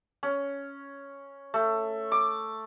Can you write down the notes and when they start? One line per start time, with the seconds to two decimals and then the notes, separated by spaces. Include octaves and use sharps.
0.23 C#4
1.54 A3
2.12 D6